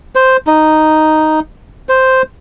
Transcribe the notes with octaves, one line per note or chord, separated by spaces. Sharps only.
C5
D#4
C5